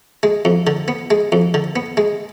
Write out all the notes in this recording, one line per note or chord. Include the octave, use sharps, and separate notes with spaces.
G#3
F2
D3
B3
G#3
F2
D3
B3
G#3